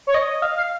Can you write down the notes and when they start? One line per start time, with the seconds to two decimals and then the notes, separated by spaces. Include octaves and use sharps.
0.07 C#5
0.14 D#5
0.42 F5
0.56 F5